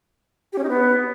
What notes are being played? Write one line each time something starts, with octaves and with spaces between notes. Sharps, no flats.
G4
C#4
D#4
B3